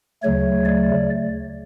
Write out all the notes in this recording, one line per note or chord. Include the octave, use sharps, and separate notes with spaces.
D2 C#3 F#3 A3 C#5
D5